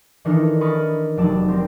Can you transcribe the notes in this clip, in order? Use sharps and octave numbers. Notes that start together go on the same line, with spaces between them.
D#3 E3 D4 D#4 A4 A#4
A#4 B5 C#6 D#6 F6 A6
F1 F#3 D5 A5 E6
C4 G4 A#4 C5